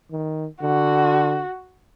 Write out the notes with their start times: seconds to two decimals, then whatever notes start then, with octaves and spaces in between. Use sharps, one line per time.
0.12 D#3
0.62 D3 F#4